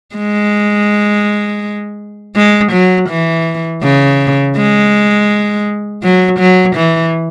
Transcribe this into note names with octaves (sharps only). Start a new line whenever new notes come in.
G#3
G#3
F#3
E3
C#3
G#3
F#3
F#3
E3